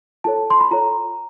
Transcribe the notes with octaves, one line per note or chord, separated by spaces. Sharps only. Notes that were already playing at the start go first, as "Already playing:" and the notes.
F4 A4 C#5 A5
C6
B5
F4 A4 C#5 A#5